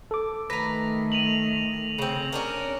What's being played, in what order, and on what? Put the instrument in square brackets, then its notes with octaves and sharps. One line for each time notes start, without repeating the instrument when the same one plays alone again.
[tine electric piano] A4 D6
[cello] D#3 A3 [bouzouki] B4 A#5 [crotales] A#6
[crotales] D#7 F7 F#7
[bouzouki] C#3 C4
C#4 D4 A#4